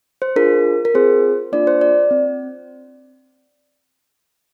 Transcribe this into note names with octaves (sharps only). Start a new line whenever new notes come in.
C5
D4 F4 G#4 A#4
A#4
C4 F4 G#4 C5
A#3 D4 F4 D5
C5
D5
C4